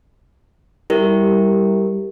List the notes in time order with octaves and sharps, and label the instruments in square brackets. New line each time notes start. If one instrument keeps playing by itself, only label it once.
[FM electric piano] G3 [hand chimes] E4 G4 A#4